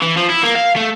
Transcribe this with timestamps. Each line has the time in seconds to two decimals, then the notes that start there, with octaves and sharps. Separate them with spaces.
0.02 E3
0.17 F3
0.30 E4
0.43 A#3
0.55 F5
0.76 A3